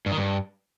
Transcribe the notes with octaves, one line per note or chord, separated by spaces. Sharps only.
G2
D#3
G2